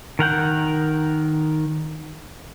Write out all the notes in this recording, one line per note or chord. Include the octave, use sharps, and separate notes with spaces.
D#3 A#4 F#5 G6